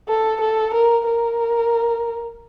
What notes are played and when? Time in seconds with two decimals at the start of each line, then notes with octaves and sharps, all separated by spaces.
0.08 A4
0.40 A4
0.73 A#4
1.06 A#4